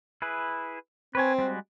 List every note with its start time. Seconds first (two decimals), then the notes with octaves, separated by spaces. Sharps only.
0.22 E4 G#4 B4
1.15 C4 B4 C#5 G#5
1.38 G3 G#3 F#4